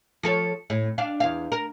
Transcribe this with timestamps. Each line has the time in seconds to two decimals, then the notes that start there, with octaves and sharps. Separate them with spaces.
0.23 F3 A4 C#5
0.70 A2
0.98 D4 F5
1.20 E2 F5
1.52 A#4